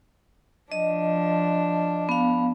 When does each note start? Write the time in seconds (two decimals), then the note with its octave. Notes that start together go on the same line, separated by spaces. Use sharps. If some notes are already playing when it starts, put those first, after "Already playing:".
0.72 F3 D4 D#5
2.09 B3 F5